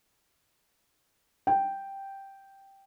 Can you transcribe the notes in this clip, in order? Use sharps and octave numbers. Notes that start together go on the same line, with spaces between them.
G5